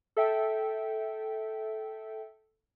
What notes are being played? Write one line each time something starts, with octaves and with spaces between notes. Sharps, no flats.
A4 E5 G5